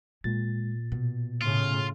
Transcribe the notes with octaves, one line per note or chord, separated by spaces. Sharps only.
A#2 G#3 A6
B2
A2 C#3 F4